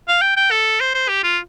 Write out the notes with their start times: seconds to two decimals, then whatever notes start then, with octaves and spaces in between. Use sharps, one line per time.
0.08 F5
0.21 G5
0.36 G5
0.51 A4
0.80 C5
0.95 C5
1.09 G4
1.23 F4